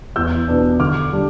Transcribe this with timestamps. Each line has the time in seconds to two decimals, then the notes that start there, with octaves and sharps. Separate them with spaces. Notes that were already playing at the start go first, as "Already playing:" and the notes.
0.16 E2 E6 G6
0.48 B2 B3 D4
0.80 D3 D6 F6
1.13 G3 D4